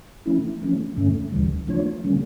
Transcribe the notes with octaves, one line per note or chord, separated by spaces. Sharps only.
F3 A3 C#4 E4
F3 A3 C#4
G2 D3 A3 C#4
D2 C#3 E3 G3
F3 A3 D4 F4 C#5
D3 G3 A#3 C#4